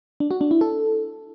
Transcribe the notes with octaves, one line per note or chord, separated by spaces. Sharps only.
D4
F#4
D4
E4
A4